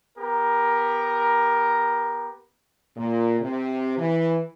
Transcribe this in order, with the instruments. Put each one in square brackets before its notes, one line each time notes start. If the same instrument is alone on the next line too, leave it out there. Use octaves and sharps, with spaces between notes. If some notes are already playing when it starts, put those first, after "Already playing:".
[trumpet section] B3 G4 A#4
[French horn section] A#2
C3
E3